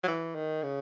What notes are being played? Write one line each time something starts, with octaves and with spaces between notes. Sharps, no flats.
F#3
E3
D#3
C#3